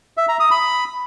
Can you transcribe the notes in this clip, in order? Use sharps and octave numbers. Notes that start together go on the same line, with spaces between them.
E5
A#5
D#6
B5